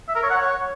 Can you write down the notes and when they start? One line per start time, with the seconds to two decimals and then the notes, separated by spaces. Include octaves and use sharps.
0.08 E5
0.15 A#4
0.23 C#5
0.30 F#5
0.37 C#5